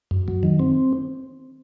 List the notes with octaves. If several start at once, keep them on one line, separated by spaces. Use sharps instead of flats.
F#2
F#3
D#3
C4